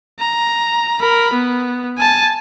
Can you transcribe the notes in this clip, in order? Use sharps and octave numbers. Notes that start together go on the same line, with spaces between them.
A#5
A#4 B5
B3
G#5 A5